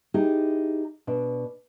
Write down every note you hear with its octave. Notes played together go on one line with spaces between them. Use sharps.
D#4 E4 G4 G#4
B2 D4